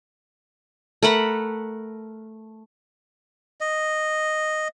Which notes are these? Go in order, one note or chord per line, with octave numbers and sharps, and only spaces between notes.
A3 A#4 F#5 B5
D#5